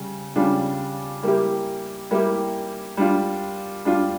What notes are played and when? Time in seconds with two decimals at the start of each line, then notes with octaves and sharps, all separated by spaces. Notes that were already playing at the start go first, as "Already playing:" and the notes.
Already playing: C#3 G3
0.36 C#3 G3 D4 F4
1.23 G3 A#3 E4 G4
2.11 G3 A#3 E4 G4
2.97 G3 D4 F4
3.85 G3 D4 F4